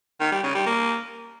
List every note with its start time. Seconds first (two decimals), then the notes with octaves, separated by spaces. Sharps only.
0.21 D#3
0.32 G3
0.43 C#3
0.55 G3
0.66 A#3